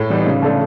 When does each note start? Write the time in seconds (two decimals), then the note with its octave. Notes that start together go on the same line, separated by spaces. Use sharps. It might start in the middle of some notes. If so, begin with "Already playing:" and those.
Already playing: A2
0.10 E3 G3 B3 D#4
0.26 C#3
0.42 F3 A3 D4